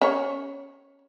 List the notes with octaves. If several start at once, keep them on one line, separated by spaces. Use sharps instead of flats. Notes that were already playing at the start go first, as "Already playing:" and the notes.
C#4 C#5